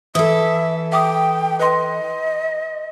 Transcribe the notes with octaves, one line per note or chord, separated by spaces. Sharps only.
E3 A4 E5 D#6
E5 G5 D6 D#6
B4 D#5 C6